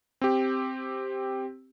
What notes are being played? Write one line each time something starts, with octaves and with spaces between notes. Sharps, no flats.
C4 G4